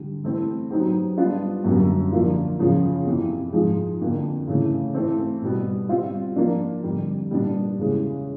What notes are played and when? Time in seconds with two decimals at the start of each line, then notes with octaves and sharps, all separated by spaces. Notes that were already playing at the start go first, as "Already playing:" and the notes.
Already playing: D3 G3
0.24 E3 A3 C4 E4
0.70 F#3 B3 D#4 G4 C5
1.18 G3 B3 D4 F4
1.64 F#2 D3 G3 A#3
2.12 D3 F3 A#3 D4 F4
2.59 E2 C#3 F3
3.06 F2 C3 E3
3.53 G#2 F3 G#3
4.01 F2 D3 F3 A#3
4.47 C#3 E3 A3
4.94 E3 A3 C4
5.42 B2 G3 B3
5.89 G3 C4 F4
6.36 F3 A#3 D4
6.83 F2 D3 G3
7.31 A#2 G3 B3 D4
7.78 E2 C#3 E3 G#3